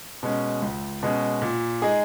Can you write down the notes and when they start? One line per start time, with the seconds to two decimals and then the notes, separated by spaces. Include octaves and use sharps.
0.23 B2 G#3 C#4
0.62 C#2
1.03 B2 G#3 C#4
1.42 A#2
1.82 G#3 D#4 G#4